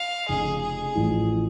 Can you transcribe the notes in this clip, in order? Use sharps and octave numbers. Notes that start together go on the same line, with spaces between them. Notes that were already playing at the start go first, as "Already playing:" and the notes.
Already playing: F5
F1 F2 C#3 G#4
G#4
A1 A2 F3